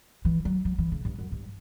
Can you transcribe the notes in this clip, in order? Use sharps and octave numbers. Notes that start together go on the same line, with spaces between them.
E3
F#3
F#3
E3
C#3
G2
F#2
G2